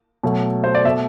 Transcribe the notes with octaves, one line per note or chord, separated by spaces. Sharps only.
B2 F#3 A3
C5
D5
B2 A3 E5